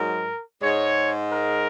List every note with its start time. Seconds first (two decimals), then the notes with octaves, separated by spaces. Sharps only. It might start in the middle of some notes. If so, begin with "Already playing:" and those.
Already playing: G#2 F#3 A#4
0.61 G#2 G#3 C#5
1.33 A#4